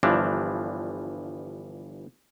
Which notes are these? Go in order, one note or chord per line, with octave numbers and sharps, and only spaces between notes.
G1 G2 E3 F3 D4